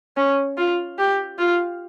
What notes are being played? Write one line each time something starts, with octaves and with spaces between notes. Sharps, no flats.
C#4
F4
G4
F4